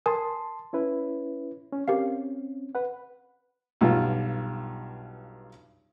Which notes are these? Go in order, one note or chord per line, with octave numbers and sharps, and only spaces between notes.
A#4 G#5 A5 C6 D#6
C#4 E4 B4
C#4
C4 C#4 G4 A#4 F5
B4 F#5
B1 G2 F4